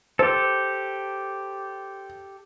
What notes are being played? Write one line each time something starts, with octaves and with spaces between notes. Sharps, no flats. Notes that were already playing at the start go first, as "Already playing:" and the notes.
G4 A4 C5